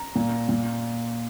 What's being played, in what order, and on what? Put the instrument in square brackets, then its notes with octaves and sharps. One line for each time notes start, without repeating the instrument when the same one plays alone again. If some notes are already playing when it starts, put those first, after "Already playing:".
Already playing: [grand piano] A#5
A#2
A#2